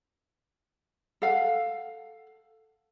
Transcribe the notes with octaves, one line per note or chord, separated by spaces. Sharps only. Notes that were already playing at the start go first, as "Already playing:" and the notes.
A4 F5 F#5